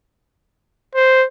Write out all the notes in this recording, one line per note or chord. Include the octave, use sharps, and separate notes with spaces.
C5